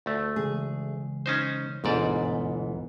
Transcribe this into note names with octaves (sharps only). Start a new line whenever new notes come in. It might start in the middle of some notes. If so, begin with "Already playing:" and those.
D2 A3
C#3 E3 G#3 G#4
C#4 D#4 C5
G1 D2 G#2 B2 E3 G#3 D5